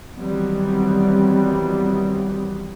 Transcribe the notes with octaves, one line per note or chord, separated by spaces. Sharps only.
D#3 E3 F#3 G3 B3 C4